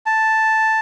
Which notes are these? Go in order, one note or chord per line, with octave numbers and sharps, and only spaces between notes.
A5